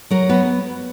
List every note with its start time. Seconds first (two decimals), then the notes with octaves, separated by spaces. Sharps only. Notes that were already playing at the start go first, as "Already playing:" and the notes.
0.11 F#3 A#4
0.29 B3 B4